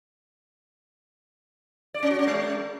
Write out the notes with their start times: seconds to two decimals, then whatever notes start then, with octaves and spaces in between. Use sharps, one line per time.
1.94 D5
2.03 C#4
2.11 F#4
2.19 C#4
2.27 G#3